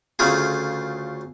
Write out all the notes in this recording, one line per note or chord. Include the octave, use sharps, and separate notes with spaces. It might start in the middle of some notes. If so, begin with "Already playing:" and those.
D2 C#3 A3 F4 G#4